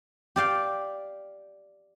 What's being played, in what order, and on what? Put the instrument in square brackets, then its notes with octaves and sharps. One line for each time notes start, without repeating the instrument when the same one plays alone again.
[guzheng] G4 D5 F5 G5